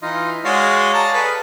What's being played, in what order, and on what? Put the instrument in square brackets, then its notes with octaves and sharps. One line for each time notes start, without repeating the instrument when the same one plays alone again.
[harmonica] E3 [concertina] D#4 F4 D#5
[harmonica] G#3 F#4 [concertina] C#5 D5 F5
[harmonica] A5 A#5
G#4 A4 B4